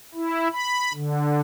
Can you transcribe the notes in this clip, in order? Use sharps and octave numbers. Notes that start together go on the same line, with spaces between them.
E4
B5
D3